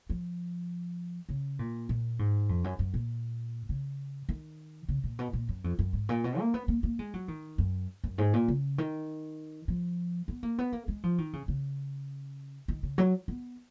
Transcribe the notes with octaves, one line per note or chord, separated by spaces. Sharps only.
F3
C#3
A#2
A#2
G#2
F2
F#2
F#2
A#2
C#3
D#3
C#3
A#2
B2
A#2
F#2
F2
F#2
G#2
A#2
B2
A#3
B3
A#3
A#3
G#3
F#3
D#3
F#2
F#2
G#2
A#2
C#3
D#3
F3
B3
A#3
B3
A#3
G#3
F3
D#3
C#3
C#3
D#3
C#3
F#3
B3